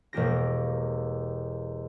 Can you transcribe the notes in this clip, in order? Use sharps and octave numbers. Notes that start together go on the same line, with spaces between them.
E1 A#3 G4 A#6